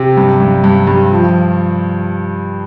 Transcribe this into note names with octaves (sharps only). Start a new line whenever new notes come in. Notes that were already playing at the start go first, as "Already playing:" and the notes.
Already playing: C3
G2
G2
G2
G2
F3